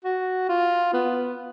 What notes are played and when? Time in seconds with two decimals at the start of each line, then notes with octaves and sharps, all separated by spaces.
0.05 F#4
0.49 F4
0.94 B3